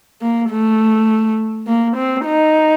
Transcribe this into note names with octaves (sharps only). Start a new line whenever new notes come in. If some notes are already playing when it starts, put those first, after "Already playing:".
A#3
A3
A#3
C4
D#4